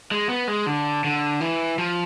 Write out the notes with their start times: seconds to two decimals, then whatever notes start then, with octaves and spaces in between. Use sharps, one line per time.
0.11 G#3
0.29 B3
0.48 G#3
0.67 D3
1.04 D3
1.41 E3
1.78 F3